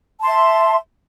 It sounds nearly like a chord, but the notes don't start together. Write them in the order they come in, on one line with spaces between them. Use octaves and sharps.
A5 C6 E5